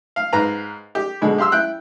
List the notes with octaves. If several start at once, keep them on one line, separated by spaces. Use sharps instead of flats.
F5
G#2 B4 F5 A#5
G4
B2 D3 G#3
G4 F5 C6 E6
E4 G5 F#6